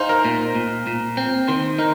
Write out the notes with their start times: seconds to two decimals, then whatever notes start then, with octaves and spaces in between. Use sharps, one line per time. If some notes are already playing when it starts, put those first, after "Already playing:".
Already playing: D#4 C5 F5 G#5
0.09 A#4
0.25 A#2
0.55 A#2
0.87 A#2
1.17 C4
1.48 D#3 C5
1.78 D#4 A#4